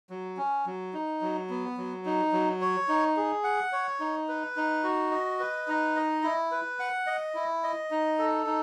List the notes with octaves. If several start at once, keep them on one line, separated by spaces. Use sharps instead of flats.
F#3
C#4
F#3
D#4
F#3
B3
F#3
D#4
F#3
C#5
D#4
G#4
F#5
C#5
D#4
B4
D#4
F#4
D#5
B4
D#4
D#5
E4
B4
F#5
D#5
E4
D#5
D#4
A4
D#4